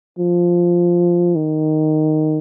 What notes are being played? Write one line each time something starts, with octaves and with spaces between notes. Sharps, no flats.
F3
D#3